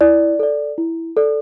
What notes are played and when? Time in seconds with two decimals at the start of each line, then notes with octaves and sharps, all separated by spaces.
0.01 E4 D5
0.39 A4 D5
0.78 E4
1.17 A4 D5